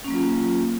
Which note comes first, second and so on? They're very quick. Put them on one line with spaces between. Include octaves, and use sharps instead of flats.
C#4 A#3 F#3 F4